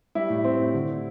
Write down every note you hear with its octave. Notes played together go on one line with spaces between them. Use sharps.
G3 E4
A2
C4
A2
D3